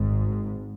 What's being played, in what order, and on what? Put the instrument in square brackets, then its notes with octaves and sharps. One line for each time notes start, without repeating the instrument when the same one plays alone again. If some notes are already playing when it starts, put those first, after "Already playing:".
Already playing: [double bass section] G#1 G#2